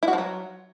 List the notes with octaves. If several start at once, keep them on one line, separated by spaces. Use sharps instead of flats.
E4
F#4
F3
F#3